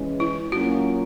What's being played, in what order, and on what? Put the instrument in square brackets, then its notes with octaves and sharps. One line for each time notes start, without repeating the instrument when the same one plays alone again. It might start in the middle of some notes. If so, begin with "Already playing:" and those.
Already playing: [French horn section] E3 G#3 C#4
[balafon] E4
[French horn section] F#3 A#3 C#4 F4 [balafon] F#4